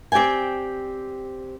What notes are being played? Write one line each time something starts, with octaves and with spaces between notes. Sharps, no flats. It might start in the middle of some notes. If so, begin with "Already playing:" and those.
C4 G4 D5 G5 G#5